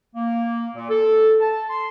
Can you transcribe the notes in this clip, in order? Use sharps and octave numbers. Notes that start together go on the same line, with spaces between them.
A#3
A#2
A4
A5
C6